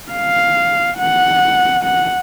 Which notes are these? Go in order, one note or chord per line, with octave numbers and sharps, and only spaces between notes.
F5
F#5
F#5